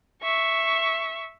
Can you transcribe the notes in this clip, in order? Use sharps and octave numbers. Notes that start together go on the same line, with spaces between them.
E5 C#6